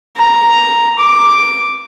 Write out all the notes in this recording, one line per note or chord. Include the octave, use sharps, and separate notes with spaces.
A#5
D6